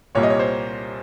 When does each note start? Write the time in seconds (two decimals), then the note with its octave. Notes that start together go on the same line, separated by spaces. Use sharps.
0.15 C2 A#2 G3 A#3 C#5
0.23 D#5
0.30 C#5
0.39 C5